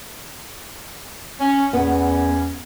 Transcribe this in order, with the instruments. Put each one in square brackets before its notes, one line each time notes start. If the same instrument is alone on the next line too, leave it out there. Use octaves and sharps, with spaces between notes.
[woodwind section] C#4
[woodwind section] E2 C#4 [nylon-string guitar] B3